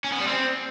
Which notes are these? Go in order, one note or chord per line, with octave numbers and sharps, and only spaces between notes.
C#4
B3
G3
C4